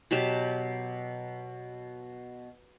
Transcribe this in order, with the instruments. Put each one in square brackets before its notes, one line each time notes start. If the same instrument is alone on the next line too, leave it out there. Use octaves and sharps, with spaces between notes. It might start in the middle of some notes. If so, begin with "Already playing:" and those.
[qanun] B2 F#3 G4 A5